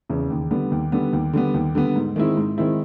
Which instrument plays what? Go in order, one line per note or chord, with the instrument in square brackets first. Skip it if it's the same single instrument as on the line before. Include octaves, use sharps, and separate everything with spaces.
[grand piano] E2 C#3
D#2
D3 G3 B3
D#2
D3 G3 B3
D#2
D3 G3 B3
D#2
D3 G3 B3
G#2
D#3 G#3 C4 E4
G#2
D#3 G#3 C4 E4